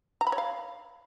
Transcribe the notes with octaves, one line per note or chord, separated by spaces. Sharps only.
A#5
B5
C#5
F5